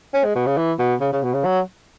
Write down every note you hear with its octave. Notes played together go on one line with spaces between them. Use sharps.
C#4
G#3
B2
C#3
E3
B2
C#3
C#3
B2
C#3
F#3